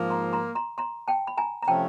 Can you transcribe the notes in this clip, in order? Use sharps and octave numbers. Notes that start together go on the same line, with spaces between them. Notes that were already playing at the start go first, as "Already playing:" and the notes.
Already playing: G#2 F3 A#3
A#5 C6
A#5 C6
A#5 C6
A#5 C6
G5 A5
B5
G#5 A#5
A#5
C3 F3 A3 C#4 G5 A5